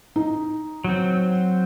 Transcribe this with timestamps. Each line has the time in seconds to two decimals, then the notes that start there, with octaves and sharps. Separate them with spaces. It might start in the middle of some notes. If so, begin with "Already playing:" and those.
0.16 D#4
0.84 F#3 C4